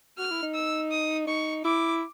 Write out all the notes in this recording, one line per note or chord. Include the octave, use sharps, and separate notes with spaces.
F#4 F6
E4
D#4
E6
D#6
D#4 C#6
E4 D6